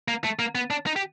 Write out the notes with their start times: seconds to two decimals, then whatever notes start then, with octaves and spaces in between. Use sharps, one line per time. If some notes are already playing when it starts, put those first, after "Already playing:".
0.08 A#3
0.24 A3
0.39 A#3
0.55 B3
0.70 D4
0.87 D#4
0.96 G4